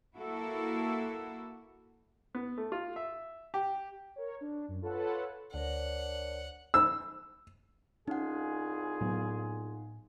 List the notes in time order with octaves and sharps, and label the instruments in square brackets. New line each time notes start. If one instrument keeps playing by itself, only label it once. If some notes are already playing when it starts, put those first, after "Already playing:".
[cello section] A#3 E4 F#4 A4
[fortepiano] B3
A3
F4
E5
G4
[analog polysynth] A#4 C#5
D4
F#2
F4 A4 B4 C#5 F#5 A5
[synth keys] D2 [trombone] D4 [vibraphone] A#4 C5 C#5 [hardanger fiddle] F#5
[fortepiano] E6
[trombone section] C2 F4 G#4 [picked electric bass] C#4 [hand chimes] D#4 F#5
[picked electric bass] A2 F#3 B3